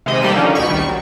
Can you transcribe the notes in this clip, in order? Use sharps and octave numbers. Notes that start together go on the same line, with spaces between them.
C3 D#3 G#3 D#5 B5
D#3 G3 A#3 A4 E7
D3 F3 A#3 C#4 D#4
D2 B2 B5 C#6
A#1 D#3 G3 C#6
F#3